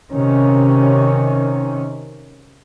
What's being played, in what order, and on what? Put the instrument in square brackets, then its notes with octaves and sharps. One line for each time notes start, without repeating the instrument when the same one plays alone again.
[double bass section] C3 D#3 C#4